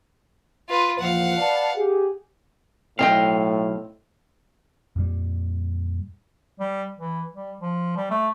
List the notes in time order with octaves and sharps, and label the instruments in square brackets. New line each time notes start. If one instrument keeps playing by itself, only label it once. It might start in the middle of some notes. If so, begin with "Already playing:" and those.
[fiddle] F4 B4
[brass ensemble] E2 A#2 F3 [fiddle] F5 F#5
[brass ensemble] B4 D5 A5
G4 G#4
[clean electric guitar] B1 C3 F5 [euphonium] A2 [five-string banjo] C4 D#5 G5
[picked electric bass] F2 A#2 G3
[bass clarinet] G3
E3
G3
F3
G3
A3